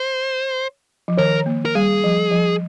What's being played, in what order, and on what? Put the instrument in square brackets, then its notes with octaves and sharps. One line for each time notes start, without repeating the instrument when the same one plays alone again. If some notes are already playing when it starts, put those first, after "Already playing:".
Already playing: [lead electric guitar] C5
[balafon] F3
[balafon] D#3 [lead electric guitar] A#4
[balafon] A#3
[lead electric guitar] A#4
[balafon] G3 [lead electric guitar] G#4
[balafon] F3
F3